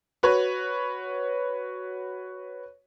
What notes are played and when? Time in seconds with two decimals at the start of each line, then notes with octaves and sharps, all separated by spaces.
0.23 F#4 B4 C#5